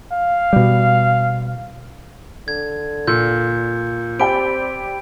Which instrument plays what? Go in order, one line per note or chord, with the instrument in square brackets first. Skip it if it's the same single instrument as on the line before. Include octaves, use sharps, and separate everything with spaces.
[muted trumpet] F5
[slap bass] B2 G3
[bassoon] D3 [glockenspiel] G#6
[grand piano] A#2 [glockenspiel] E6 G6
[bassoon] C4 [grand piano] G4 [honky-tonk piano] D5 G5 B5 [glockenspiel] D7